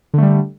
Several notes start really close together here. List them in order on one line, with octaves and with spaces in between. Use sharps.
D3 A3 G3